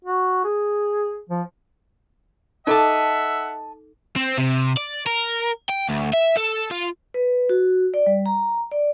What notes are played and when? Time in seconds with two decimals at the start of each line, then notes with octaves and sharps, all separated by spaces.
0.05 F#4
0.44 G#4
1.30 F3
2.67 D#4 A4 D#5 E5 F#5 A5 D6
4.16 C4
4.38 C3
4.77 D5
5.06 A#4
5.69 G5
5.89 D2
6.14 E5
6.37 A4
6.71 F4
7.14 B4
7.49 F#4
7.94 D5
8.06 G3
8.26 A#5
8.72 D5